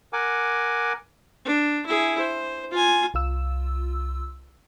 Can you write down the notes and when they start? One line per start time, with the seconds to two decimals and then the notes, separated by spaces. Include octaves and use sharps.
0.13 A#4 F#5 G#5 D6
1.45 D4
1.86 E4 G#4
2.19 C5
2.71 F4 G#5
3.14 C2 F4 E6